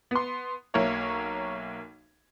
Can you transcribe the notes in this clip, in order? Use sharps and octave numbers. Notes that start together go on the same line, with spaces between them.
B3 C6
B1 A#3 A#4 C#5 E5